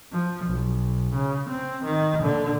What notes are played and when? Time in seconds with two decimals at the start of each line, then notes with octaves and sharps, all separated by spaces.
0.12 F3
0.46 B1
1.15 C#3
1.50 C4
1.84 D#3
2.21 A#2 D3